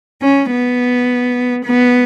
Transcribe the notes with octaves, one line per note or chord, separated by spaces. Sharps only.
C#4
B3
B3